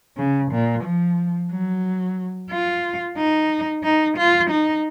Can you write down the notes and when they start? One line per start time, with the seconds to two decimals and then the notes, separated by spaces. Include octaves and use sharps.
0.17 C#3
0.51 A#2
0.84 F3
1.51 F#3
2.51 F4
3.17 D#4
3.83 D#4
4.17 F4
4.50 D#4